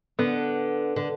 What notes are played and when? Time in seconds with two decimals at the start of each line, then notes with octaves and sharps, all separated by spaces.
0.19 D3 B3
0.96 D3